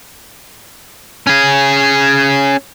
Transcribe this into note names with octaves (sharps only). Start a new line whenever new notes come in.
C#4 G#4